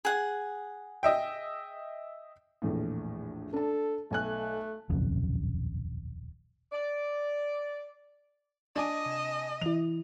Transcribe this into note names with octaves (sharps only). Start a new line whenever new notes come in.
G#4 F#5
D#5 E5 G5
A#1 E2 A2
D4 A4 A5
B1 A3 G#5 F#6
D#1 B1 F2 C#3
D5
D4 D#5 G#5 D6
C3 E7
E3 E4 F7